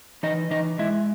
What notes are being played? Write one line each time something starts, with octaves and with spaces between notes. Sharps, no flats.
E3 D#4 D#5
E3 D#4 D#5
G#3 E4 E5